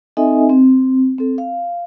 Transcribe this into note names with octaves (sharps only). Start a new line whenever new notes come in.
C4 D#4 A4 D#5 E5 G#5
C4
C4 A4
F5